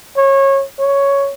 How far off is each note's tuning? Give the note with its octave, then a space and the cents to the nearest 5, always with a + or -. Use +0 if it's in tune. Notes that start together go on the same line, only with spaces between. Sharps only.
C#5 -25
C#5 +5